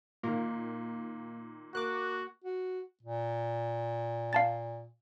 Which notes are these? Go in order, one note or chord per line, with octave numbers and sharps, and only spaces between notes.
A#2 D#3 A#3
A#3 F#4 D6 F#6
F#4
A#2
F5 A5 A6